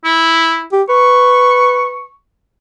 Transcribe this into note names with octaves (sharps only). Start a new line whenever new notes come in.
E4
G4
B4 C#6